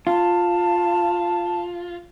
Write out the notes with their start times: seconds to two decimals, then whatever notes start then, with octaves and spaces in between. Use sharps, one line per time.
0.07 F4 A5